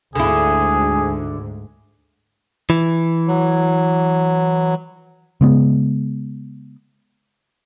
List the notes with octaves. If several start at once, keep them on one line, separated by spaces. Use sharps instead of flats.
D2 G#2 D3 E4 G#4
E3
F#3
C#3 G#3 B3